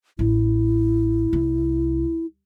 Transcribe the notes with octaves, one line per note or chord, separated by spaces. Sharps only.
A1 E4
C2